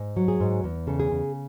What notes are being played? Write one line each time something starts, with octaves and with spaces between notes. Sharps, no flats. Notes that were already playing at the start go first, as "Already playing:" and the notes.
Already playing: G#2
F#3
G#4
G#2
E2
C#3 A4
G#4
C#3